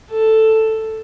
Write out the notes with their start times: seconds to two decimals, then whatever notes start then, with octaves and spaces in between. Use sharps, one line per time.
0.11 A4